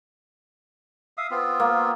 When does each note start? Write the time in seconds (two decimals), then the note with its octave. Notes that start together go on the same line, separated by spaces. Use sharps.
1.17 E5 F5 D#6
1.31 B3 C4 F4
1.60 A#3